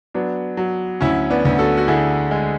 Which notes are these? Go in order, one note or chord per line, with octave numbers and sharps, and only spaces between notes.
F#3 B3 D4
F#3
D2 C#4 E4
B3 D4
D2
F#4 A4
F#4
D3 E4 G#4
G#3